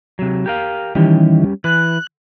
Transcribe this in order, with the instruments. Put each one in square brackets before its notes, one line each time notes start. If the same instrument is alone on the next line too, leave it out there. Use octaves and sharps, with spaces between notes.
[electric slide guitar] C3 F#3
G4 A#4 F5
[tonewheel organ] D#3 E3 [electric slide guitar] G3 C#4 G4
[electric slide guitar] E3 B4 [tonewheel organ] F#6